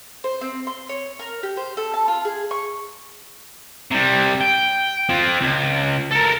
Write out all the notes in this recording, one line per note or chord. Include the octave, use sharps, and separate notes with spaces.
C5
C4
C6
C#5
A#4
G4
C5
A4
A5
F4
G#4
C#6
C3 G3
G5
C4 F4
C#2
A4 A#4